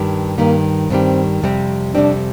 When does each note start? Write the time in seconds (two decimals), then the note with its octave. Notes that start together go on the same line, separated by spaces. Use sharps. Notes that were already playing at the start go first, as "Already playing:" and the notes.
Already playing: G2 D#3 G3
0.38 G2 D#3 G3 A#3
0.90 G2 D#3 G3 C4
1.42 F2 C3 G3 C4
1.94 F2 C3 G3 C4 D4